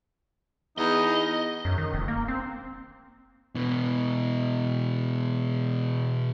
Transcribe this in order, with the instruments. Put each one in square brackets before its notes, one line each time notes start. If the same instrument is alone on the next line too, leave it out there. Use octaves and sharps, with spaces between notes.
[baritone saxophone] E2 [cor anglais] D#4 [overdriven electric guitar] D#5
[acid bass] F#2
D#3
F1
A#3
C4
[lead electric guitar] B2 E3